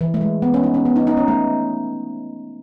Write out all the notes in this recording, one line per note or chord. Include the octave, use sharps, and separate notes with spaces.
E3
A3
G#3
B3
C#4
D#4
C#4
B3
D#4
D#4
C#4
A3